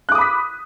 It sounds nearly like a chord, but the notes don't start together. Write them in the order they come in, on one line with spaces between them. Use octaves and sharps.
F#6 D6 D#6 B5 B6